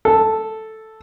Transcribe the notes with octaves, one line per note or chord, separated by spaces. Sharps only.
A4